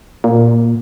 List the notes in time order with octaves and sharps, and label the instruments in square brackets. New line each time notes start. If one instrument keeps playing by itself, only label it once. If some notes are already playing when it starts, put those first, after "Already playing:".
[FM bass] A#2